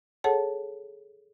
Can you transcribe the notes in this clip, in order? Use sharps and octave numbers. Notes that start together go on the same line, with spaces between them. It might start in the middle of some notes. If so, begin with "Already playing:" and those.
G#4 A4 C#5 F#5 A5